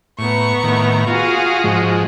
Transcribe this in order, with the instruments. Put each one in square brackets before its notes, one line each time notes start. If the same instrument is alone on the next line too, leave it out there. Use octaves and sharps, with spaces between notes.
[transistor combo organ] A2 [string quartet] B3 A#5 C#6
[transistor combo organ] A2 D#3
[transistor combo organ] F4 [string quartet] F#4 G#4
[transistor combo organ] G#2 F3 G#3